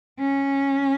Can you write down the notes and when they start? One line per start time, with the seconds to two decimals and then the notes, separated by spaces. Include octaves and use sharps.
0.20 C#4